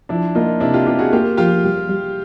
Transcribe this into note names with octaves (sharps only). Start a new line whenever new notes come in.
F3 D4 E4
A#3 D#4 F4
C3 D4 E4
F4 G4
B3 F4 G4
F#4 G#4
A#3 F4 G4
F3 F4 G4
G3
G3